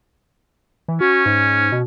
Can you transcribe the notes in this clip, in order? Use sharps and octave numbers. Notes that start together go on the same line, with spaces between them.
E3
C#4 F#4
G#2
B2